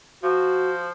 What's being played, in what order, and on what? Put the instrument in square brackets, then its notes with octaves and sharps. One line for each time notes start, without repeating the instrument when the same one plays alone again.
[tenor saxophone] F3 [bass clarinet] F#4